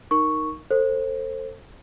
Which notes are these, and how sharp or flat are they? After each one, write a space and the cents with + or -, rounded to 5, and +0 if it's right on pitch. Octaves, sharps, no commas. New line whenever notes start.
D#4 +0 A#4 +0 C#6 +0
A4 +30 C5 +20